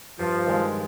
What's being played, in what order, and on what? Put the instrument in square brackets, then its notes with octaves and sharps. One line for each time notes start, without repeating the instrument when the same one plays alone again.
[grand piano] G2 [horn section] F3
[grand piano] D#3 G#3